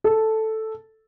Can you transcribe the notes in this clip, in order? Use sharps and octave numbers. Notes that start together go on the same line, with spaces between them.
A4